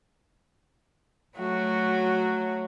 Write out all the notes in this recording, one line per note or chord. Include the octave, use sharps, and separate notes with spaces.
F#3 A3 F#4